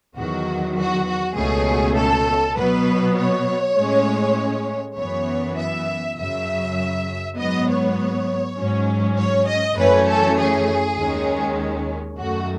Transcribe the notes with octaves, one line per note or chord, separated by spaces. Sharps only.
E2 D#3 F#3 F#4
F#4
F#4
C#2 B2 A3 C#4 G#4
A4
B2 F#3 B3 B4
C#5
A2 G#3 C#4
F#2 E3 B3 C#5
E5
F#2 C#3 F#3 E5
G#2 F#3 B3 D#5
C#5
G#2 F#3 C#4
C#5
D#5
F#2 E3 A3 C#4 B4
A4
G#4
D#2 D#3 G#3 C#4
F#2 D#3 A3 F#4